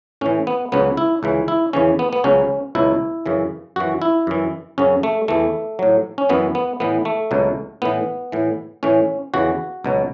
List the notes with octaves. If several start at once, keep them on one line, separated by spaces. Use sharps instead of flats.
A2 E3 C#4
B3
C#2 C#3 F#3 B3
E4
C#2 C#3 E3
E4
E2 C#3 E3 C#4
B3
B3
C#2 C#3 F#3 C#4
C#2 B2 F#3 E4
F#2 C#3 E3
F#2 E3 F#4
E4
F#2 E3
F#2 C#3 F#3 C#4
A3
E2 E3 A3
A2 F#3
C#4
F#2 E3 B3
B3
A2 E3 B3
A3
C#2 B2 F#3
A2 E3 B3
A2 E3
A2 E3 C#4
E2 C#3 E3 F#4
C#2 B2 F#3